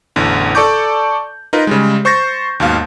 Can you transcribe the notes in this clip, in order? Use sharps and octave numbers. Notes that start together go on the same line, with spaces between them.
A1 E2 D3
A4 D5 A5 C#6 D6 G6
D#4 F4 A#4 B4
C#3 G3 G#3
C5 C#6 G6 A6 A#6
D#2 G#2 B2 F5